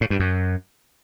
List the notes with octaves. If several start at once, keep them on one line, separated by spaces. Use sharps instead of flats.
A2
G2
F#2